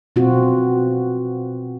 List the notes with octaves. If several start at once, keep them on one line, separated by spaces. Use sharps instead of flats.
B2 C4 F4 F#4